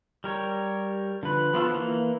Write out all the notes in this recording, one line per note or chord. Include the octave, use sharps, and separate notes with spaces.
G3 A#4 C#5
D3 F3 B4
F3 B3 F4 F#4 A4
E3 A#3